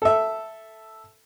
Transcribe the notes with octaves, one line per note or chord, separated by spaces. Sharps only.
A4 E5